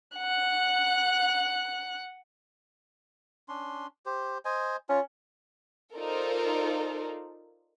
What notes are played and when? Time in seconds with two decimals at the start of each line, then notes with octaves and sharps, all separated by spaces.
0.18 F#5 F#6
3.48 C#4 D4 C6
4.06 G4 C5
4.45 C5 D#5 G#5
4.89 C#4 F4
5.95 D#4 F4 A4 A#4 C5 D5